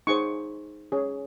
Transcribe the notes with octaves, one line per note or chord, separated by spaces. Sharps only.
D#4 G#4 C5 C#6
C#4 G#4 C#5